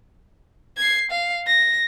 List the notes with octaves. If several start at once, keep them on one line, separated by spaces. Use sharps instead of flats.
G#6 C7
F5
A#6